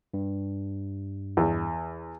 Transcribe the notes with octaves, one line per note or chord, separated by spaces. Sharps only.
G2
E2